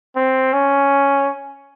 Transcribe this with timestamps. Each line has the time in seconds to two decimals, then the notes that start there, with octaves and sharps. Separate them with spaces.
0.16 C4
0.53 C#4